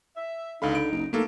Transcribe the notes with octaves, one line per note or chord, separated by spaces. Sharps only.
E5
C#2 D3 D#4 F5 B5
D7
F#1
B1 A3 A#3 A4